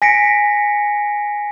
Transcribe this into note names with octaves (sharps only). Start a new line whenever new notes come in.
G#5 A#6 B6 C#7 D7